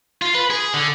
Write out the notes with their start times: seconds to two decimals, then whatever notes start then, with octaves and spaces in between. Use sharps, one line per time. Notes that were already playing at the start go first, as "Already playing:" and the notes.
0.22 F4
0.35 B4
0.50 G#4
0.74 D3